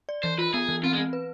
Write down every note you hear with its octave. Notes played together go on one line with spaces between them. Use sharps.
D5
E3 C5
F4 B4
B3 G#4
E3
C4 F4
G#3
C4
B4